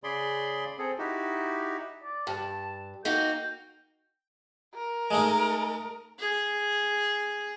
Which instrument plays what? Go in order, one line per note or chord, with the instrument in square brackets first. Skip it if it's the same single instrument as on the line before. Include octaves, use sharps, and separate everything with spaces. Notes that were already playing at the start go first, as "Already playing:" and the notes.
[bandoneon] C#3 G#4 D5 B5 C6
C4 G#4 A4
D#4 E4 F#4 G4
[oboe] D5
[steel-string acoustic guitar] G2 [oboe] A5
[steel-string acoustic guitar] A#3 D#4 F#4 [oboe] G5
[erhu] A#4
[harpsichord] G#3 A3 D#4
[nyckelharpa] G#4